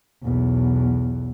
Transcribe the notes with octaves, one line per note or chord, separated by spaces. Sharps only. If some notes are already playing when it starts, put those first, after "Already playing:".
B1 E2